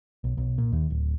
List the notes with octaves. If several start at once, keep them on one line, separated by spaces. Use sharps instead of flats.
B1
B1
A#2
D#2
D1